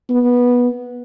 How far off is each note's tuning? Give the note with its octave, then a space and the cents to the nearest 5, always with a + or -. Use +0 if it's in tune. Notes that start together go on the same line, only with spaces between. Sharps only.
B3 -15